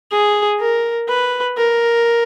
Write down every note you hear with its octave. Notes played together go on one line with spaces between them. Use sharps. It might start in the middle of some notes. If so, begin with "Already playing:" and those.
G#4
A#4
B4
A#4